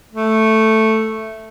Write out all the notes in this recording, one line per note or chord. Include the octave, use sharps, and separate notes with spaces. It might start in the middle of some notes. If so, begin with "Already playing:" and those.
A3